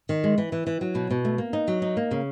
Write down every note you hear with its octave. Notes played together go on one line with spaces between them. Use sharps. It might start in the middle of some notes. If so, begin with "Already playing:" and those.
D#3
G#3
E3
E3
E3
F#3
B2
B2
A3
A#3
D#4
F#3
D#4
A#3
C#3